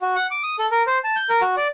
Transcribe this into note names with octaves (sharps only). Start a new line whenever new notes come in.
F#4
F#5
D6
D#6
A4
A#4
C5
A5
G6
A#4
F#4
D5